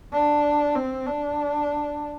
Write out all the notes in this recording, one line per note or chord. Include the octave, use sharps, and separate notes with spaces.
D4
C4
D4